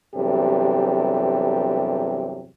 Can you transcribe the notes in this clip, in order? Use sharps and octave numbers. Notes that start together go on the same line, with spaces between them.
E2 G2 C3 F#3 G4 A4